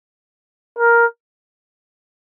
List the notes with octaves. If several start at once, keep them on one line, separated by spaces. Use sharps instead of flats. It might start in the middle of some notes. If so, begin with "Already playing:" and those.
A#4